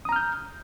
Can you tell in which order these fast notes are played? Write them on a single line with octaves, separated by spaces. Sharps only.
D#6 A#5 F6 G6